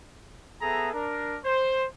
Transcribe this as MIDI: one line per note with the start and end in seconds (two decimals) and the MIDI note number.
0.61 0.91 59
0.61 0.91 68
0.61 0.91 69
0.61 0.91 76
0.61 0.91 82
0.92 1.38 62
0.92 1.38 70
1.44 1.86 72